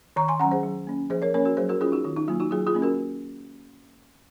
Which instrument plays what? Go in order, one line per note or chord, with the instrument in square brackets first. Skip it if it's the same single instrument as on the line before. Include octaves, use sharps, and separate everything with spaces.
[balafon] D#3 A#5 C#6
G#5 C6
F#3 C#4 F#5 A#5
G#4 C5
F#3
A#3 C#4
F3 G#4 C5
A#4 C#5
A#3 C#4 A#4 C#5
F#4 A#4
F#3 G#4 C5
F#4 A#4
C#4 F4 G#4
D#4 F#4
D#3 F4
D#4
F#3 A#3 F4
D#4 F#4
F#3 F4 G#4
F4 G#4
A#3 C#4
F#4 A#4